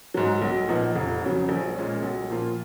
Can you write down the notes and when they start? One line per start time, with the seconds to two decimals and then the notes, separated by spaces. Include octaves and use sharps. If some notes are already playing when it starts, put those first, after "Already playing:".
0.14 G#2 F#3
0.42 B1
0.68 A#2 F3 B3 D#4
0.96 F1
1.22 F2 C#3 F#3
1.49 A#1
1.76 A#2 G#3 C#4
2.02 B1
2.30 A#2 F3 A#3 F4